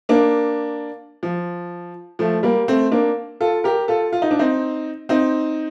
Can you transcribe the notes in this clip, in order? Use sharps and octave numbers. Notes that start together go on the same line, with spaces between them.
A#3 D4
F3
F3 A3
G3 A#3
A3 C4
A#3 D4
F4 A4
G4 A#4
F4 A4
F4
D#4
D4
C4 D#4
C4 D#4